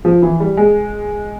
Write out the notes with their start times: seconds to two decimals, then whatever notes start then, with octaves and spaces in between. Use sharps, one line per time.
0.05 F3
0.22 E3
0.40 G3
0.57 G#3